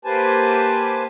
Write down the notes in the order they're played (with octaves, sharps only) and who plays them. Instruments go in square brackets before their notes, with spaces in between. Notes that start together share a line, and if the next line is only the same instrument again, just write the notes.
[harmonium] A#3 G4 B4 C5 G#5 A5